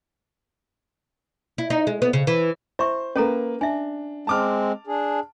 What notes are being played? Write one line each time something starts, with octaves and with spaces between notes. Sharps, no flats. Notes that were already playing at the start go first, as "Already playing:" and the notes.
E4
D#4
G#3
B3
C#3
E3
E4 C5 E5 C#6
A#3 C#4 A4 B4 A#5
D4 E5 G#5
G#3 C4 A5 D6 F6
D4 G#4